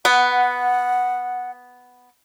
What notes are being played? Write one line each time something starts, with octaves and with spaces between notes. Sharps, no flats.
B3 F#5